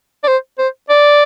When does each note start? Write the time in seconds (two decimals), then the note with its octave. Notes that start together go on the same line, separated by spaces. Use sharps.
0.24 D5
0.28 C5
0.58 C5
0.89 D5